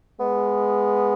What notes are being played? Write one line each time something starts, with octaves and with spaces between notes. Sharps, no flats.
G#3 B3